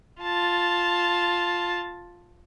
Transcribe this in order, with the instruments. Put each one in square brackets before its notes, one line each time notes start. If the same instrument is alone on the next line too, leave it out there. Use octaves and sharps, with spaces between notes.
[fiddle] F4 A5